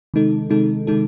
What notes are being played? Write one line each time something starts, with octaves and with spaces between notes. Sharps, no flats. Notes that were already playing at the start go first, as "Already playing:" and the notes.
C3 D#3 G#3 D#4 A4
C3 D#3 G#3 D#4 A4
C3 D#3 G#3 D#4 A4